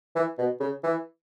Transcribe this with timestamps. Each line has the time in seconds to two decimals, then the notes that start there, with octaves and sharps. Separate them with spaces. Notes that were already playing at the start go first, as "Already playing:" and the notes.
0.15 E3
0.38 B2
0.60 C#3
0.83 E3